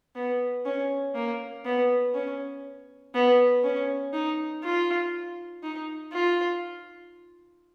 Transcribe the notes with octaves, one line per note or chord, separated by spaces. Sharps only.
B3
C#4
A#3
B3
C#4
B3
C#4
D#4
F4
D#4
F4